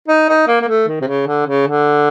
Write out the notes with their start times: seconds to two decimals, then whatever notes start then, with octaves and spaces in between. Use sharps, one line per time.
0.08 D#4
0.29 D#4
0.48 A#3
0.62 A#3
0.68 A3
0.88 D#3
1.01 C3
1.07 C#3
1.27 D3
1.47 C#3
1.68 D3